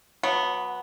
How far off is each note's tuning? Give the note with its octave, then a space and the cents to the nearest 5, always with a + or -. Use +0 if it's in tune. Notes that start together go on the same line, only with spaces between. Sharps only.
F#3 -20 B3 +0